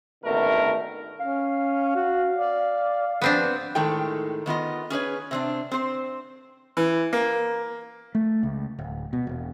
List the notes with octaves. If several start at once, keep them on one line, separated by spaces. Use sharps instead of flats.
G#1 C#2 B2 D3 A3 A#4
C#4 F5
F#4
D5
G2 F3 B3 C4 D4
A2 D#3 G#3 A4 G5
D#3 B3 F4 D#5
C#4 G#4 B4 C#5
C3 C4 D4
C4 C5
E3
A#3
A3
C#2
D1
B2
E1